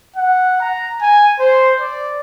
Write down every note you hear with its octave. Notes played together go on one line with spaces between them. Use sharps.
F#5
A#5
G#5
C5
D5